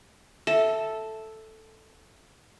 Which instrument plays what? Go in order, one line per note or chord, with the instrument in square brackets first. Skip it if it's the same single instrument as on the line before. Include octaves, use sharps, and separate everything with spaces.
[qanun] A4 [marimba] E5